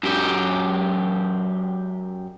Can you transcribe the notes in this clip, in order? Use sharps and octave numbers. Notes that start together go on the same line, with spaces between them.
F#2 G4